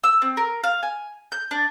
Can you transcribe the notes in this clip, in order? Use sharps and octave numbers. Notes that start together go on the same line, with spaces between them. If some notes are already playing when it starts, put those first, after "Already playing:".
E6
C4
A#4
F5
G#5
G6
D4